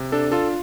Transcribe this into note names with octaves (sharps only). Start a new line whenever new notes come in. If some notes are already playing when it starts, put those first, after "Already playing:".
Already playing: C3
D4 A4
F4 A4